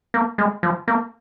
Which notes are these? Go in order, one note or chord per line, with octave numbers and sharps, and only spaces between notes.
A#3
G#3
F3
A#3